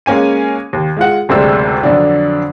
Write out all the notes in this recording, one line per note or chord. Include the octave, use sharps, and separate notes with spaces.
G#3 A#3 C#4 G#5 D#7
D#2
G#3 F4 F#5
F#1 D2 C3 G#3 D5 E6
F2 D3 F#3 D4